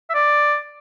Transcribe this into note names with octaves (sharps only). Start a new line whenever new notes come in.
E5
D5